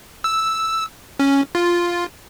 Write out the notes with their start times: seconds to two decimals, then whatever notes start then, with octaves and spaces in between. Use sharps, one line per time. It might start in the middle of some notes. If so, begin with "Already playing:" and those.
0.24 E6
1.19 C#4
1.55 F4